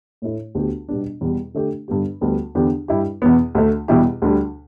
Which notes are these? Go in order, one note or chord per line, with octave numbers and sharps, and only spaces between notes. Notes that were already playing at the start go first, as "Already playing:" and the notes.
A2 A3 E4
D2 D3 B3 G4
B2 G3 B3 D4
E2 B2 G3
D3 A3 D4 G4
G2 D3 B3 G4
D2 D3 G3 B3
E2 D3 B3 D4 G4
G2 G3 E4 G4
E2 B2 B3
D2 D3 A3
E2 B2 G3 E4 G4
D2 D3 G3